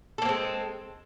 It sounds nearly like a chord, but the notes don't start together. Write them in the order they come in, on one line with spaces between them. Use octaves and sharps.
A4 A#3 C4 G#3